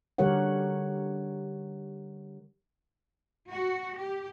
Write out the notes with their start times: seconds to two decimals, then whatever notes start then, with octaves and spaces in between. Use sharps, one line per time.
0.18 D3 G3 G4 A#4 C#5 F#5
3.49 F#4
3.99 G4